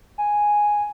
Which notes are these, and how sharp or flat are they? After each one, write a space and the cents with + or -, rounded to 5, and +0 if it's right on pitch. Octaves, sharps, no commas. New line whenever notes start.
G#5 +0